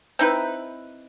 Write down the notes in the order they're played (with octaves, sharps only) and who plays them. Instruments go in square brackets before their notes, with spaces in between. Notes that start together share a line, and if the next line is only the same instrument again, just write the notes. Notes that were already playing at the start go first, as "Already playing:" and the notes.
[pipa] C4 D#4 E4 B4